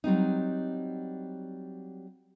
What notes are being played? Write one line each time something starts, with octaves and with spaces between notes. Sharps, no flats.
F#3 G3 C4 D#4